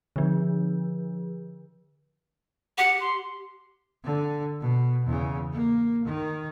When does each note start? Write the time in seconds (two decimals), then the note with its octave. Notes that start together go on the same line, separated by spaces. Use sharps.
0.16 D3 F3
2.78 G4 F#5
3.00 C6
4.04 D3
4.61 B2
5.06 E2 C#3
5.52 A#3
6.05 D#3